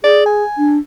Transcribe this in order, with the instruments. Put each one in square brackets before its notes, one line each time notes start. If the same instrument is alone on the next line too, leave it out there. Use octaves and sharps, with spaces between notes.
[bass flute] G#4 [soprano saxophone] D5
[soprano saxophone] G#5
[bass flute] D4